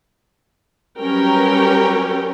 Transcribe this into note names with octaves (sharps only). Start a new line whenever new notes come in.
F#3 G3 C#4 A#4 B4 G5